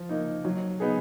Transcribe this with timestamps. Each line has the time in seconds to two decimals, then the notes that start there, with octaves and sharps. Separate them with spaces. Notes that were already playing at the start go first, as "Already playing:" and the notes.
Already playing: F3
0.09 A#3 D#4
0.45 F#3
0.80 B3 D#4 G#4